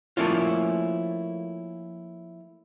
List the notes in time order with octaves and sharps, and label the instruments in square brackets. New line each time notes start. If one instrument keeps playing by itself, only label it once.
[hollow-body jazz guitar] F3 A3 A#3 C#4 E4 F4